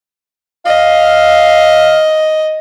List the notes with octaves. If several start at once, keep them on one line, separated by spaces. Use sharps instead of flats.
D#5 F5